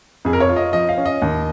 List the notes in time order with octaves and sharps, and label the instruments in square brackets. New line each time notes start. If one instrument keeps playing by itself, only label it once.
[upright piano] F2 G#4
A#4
C#5
F4
D#5
F3 D#5
F5
C#4
D#5
D#2